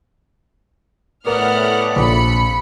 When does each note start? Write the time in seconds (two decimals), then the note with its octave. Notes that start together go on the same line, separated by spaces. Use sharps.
1.27 A2 B3 A#4 D5 F#5 D#6 F6
1.96 A#1 C3 B5 C#7